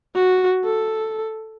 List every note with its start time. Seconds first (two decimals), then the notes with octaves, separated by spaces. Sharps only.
0.15 F#4
0.64 A4